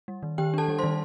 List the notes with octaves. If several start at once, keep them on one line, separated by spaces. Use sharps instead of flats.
G3
D#3
D#3 G4 G5
D4 A4 A5
G3
D#3 C5 C6